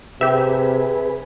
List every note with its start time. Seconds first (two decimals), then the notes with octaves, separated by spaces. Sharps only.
0.21 C3 G4 G#4 B4 E5